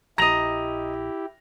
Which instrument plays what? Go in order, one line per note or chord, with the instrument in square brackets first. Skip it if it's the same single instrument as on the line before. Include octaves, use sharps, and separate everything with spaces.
[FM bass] A#1 [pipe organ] E4 G4 [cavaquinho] D#5 A#5 [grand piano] A#6 F7